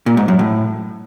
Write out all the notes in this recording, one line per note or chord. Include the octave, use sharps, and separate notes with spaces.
A#2
G#2
F#2
A2